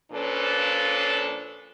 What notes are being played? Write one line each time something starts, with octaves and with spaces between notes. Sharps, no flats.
A#2 F3 C#4 D4 A4 B4